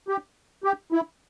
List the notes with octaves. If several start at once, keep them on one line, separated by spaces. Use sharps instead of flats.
G4
G4
E4